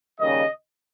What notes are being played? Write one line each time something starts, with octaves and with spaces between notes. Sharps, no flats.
D#2 C#3 G3 A#3 C#4 D#5